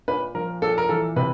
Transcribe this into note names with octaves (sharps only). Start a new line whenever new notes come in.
A#2 B4
F3 A#4
A#2 A4
A#4
E3 A4
C3 B4